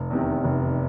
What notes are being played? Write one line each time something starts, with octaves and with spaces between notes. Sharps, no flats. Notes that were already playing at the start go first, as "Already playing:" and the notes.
Already playing: F1
E2 C3 D#3
F1